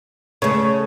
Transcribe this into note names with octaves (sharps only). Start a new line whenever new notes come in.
C#3 A3 C#5